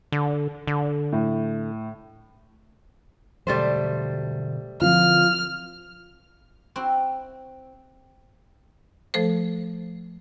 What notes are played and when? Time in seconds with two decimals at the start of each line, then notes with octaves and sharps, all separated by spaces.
0.12 D3
0.67 D3
1.12 A2
3.47 B2 D3 F#3 G3 A3 C5
4.81 D3 F3 C4 F4 F6
6.76 C4 E4 F#4
9.14 F3 A3 A4 C5